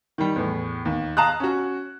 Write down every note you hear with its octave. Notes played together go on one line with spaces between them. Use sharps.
D#3 G3
E2 A2
D#2
F5 A5 A#5 D#6 F#6
C#4 F#4